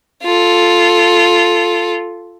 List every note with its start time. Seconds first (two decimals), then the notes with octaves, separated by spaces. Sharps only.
0.24 F4 A4